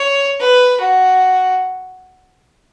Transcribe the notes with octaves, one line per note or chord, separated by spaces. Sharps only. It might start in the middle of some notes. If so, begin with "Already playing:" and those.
Already playing: C#5
B4
F#4